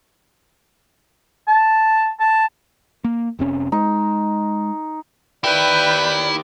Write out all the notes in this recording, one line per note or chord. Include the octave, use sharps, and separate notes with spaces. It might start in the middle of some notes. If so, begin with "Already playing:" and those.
A5
A5
A#3
F1 C3 C#4
G#3 D#4
D#3 E4 G4 B4 D5 G5